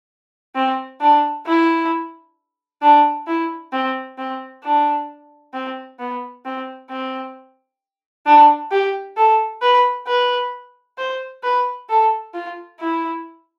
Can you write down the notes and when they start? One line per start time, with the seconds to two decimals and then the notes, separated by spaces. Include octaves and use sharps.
0.55 C4
1.01 D4
1.46 E4
2.82 D4
3.27 E4
3.73 C4
4.18 C4
4.63 D4
5.54 C4
5.99 B3
6.45 C4
6.90 C4
8.26 D4
8.71 G4
9.17 A4
9.62 B4
10.07 B4
10.98 C5
11.44 B4
11.89 A4
12.34 F4
12.80 E4